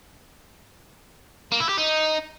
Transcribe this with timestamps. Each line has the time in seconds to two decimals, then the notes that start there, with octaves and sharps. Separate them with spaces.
1.52 A#3
1.60 E4
1.69 G4
1.78 D#4